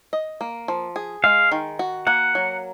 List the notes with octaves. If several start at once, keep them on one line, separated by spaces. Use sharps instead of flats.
D#5
A#3
F3
G#4
G#3 F5
D#3
F#4
A#3 F#5
F#3